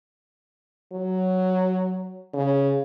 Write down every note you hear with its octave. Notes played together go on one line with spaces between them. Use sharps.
F#3
C#3